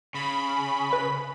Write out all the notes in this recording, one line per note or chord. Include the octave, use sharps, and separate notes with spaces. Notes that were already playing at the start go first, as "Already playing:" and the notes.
C#3 B5
B4